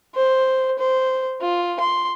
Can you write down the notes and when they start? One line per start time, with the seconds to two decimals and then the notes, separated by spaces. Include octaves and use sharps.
0.15 C5
0.79 C5
1.41 F4
1.80 C6